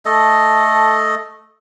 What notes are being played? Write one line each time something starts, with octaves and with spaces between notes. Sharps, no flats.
A3 A4 D#5